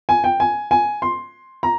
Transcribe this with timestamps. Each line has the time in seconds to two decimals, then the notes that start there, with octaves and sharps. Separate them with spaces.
0.09 G#5
0.24 G5
0.40 G#5
0.71 G#5
1.02 C6
1.63 A#5